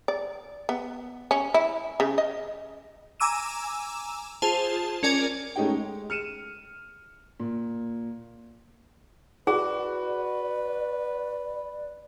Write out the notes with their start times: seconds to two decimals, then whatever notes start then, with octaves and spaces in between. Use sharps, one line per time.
0.08 D5
0.69 B3
1.31 C#4
1.54 E4
2.00 C#3
2.18 D#5
3.20 G#5 A#5 D6 E6 D#7 E7
4.42 F4 G#4 C5 A5
5.03 C#4 A#4 D5 G#5
5.56 G#3 A3 C#4 D#4 G4 G5
5.70 G#3
6.10 F6 C#7 D#7 E7
7.40 A#2
9.47 F#4 G#4 B4 D5